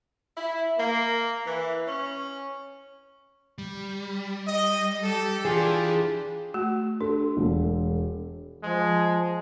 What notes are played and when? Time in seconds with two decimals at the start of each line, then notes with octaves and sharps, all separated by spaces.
0.37 E4
0.78 A#3
1.46 E3
1.87 C#4
3.58 G3
4.46 D#5
5.02 G4 A4
5.45 E3 D4 F4 G4 G#4
6.54 A3 F#4
7.01 D4 A4
7.37 E1
8.63 F3 G#3